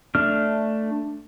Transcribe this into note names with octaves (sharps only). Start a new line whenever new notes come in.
A3 D4 F6